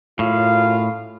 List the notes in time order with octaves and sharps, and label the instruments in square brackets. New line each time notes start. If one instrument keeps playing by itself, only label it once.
[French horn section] F#2 F4 [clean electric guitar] A2 [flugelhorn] F5